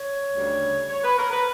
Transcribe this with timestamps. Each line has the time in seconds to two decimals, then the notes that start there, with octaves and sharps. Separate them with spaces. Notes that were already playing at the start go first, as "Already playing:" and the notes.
Already playing: C#5
0.32 D2 C#3 G3
0.89 C#5
1.03 B4
1.17 A#4
1.31 B4